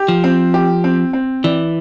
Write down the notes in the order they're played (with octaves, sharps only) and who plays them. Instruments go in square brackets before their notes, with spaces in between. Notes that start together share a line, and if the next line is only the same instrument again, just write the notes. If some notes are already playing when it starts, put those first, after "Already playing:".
Already playing: [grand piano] G4
[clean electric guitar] F3
[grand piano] C4
G4
C4
C4
[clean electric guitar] E3 [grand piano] D5